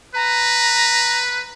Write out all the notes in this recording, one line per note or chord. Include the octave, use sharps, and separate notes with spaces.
B4 A#5